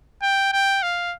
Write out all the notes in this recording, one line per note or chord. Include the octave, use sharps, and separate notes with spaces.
G5
G5
F5